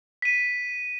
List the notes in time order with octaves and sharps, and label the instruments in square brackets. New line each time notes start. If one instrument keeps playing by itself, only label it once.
[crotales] B6 D#7